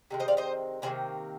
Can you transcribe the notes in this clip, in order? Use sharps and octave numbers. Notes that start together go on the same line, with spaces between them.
C3 D#3 G#3
C5 D#5
D5 F5
C5 D#5
C3 D#3 A#3 G#4 C5